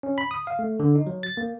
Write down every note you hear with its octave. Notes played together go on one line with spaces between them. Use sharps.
C#4
B5
D#6
F5
A3
D3
D#4
F#3
A6
A#3